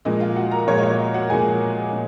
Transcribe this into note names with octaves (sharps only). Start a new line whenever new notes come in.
A#2 F3 G#3 D#5
F4 F5
F#4 F#5
A#4 A#5
A#2 F3 G#3 C#5
D#5
C#5
D#5
F#4 F#5
A#2 F3 G#3 G#4 G#5
A#2